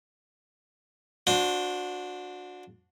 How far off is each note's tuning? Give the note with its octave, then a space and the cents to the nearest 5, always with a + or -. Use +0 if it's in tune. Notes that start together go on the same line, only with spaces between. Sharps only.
D4 +0 F#4 -30 C5 +0